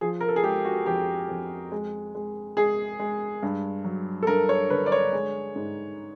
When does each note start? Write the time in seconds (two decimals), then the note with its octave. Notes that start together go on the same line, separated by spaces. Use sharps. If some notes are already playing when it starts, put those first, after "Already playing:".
0.01 F3 G#4
0.21 A#4
0.28 A4
0.36 G#4
0.43 G#3 G4
0.65 F#4
0.86 F2 G4
1.29 F2
1.72 G#3
2.15 G#3
2.57 G#3 G#4
3.00 G#3
3.43 G2
3.84 F#3
4.23 A4
4.27 G2 A#4
4.49 C#5
4.70 D3 B4
4.86 D5
4.92 C#5
5.13 G#3
5.56 G#2